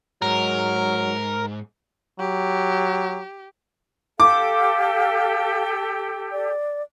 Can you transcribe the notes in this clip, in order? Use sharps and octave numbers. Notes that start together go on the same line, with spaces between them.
G#2 F#3 A#4
F#3 G4
G4 A4 F5 D6
D5